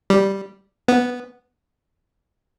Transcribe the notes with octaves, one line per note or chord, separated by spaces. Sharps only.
G3
B3